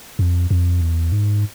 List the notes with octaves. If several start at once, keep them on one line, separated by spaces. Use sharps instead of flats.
F2
F2
E2
G#2